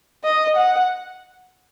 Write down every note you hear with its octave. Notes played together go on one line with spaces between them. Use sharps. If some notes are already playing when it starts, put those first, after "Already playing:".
D#5
F#5